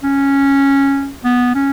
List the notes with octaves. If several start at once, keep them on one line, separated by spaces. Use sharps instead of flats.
C#4
B3
C#4